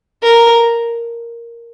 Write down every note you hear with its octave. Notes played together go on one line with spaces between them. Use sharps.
A#4